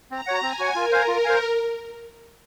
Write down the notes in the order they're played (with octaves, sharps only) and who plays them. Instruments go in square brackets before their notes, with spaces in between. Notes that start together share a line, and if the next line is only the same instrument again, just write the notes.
[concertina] C4 [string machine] A#5
[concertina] F#4 C#5 F#5
[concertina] C4 [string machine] G#5
[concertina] F#4 C#5 F#5
[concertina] F4 [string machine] A#4
[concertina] C5 F5 G#5
[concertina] F4 [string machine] A#4
[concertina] C5 F5 G#5